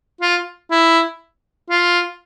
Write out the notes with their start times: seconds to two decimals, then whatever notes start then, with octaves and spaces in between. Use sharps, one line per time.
0.21 F4
0.71 E4
1.70 F4